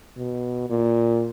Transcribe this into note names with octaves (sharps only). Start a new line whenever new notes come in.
B2
A#2